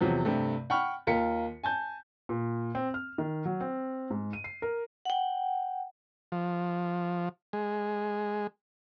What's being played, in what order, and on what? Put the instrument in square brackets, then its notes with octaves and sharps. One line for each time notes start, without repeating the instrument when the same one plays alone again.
[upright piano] E2 C3 F3 F#3
G2 C3 A3
F#5 G5 B5 C#6 F6
D#2 F4 A#4 B6 C#7
G#5 A5 G6
[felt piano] A#2
C4
F6
D#3
F#3
C4
G#2
D#7
C7
A#4
[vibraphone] F#5 G5
[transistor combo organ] F3
G#3